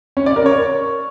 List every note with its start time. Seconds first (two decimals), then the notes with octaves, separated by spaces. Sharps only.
0.17 C#4
0.26 D5
0.36 A#4
0.46 C#5